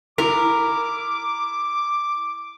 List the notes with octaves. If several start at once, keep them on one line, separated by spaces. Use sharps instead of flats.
E4 A#4 D6